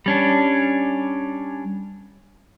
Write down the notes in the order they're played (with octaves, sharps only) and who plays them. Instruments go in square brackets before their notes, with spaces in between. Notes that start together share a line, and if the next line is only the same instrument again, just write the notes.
[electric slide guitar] G3 C#4 D4